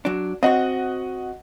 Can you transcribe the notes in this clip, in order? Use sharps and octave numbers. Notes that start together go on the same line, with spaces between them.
F#3 D4
C4 F#4 D#5 F#5